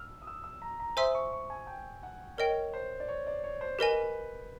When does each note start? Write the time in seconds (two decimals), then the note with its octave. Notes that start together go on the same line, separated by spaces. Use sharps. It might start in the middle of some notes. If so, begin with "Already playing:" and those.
Already playing: E6 F6
0.22 D#6
0.27 E6
0.44 E6
0.62 A#5
0.80 A#5
0.97 C5 E5 G#5 C6 D#6 E6
1.15 C#6
1.33 C#6
1.50 G#5
1.67 G5
2.03 F#5
2.38 A#4 C#5 D#5 G5
2.73 C5
3.00 D5
3.09 C#5
3.27 D5
3.44 C#5
3.61 C5
3.79 G4 A#4 B4 D#5 G#5